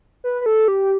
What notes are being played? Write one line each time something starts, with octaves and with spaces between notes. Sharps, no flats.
B4
B4
A4
G4